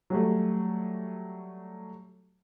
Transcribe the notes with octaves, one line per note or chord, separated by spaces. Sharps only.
F#3 G3 A3